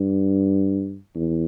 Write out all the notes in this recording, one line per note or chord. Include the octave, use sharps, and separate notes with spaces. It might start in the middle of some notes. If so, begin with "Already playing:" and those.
Already playing: G2
E2